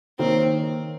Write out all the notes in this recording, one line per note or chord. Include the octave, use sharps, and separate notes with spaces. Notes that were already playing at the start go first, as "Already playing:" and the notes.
D#3 A#3 C4 D#4 A#4 C#5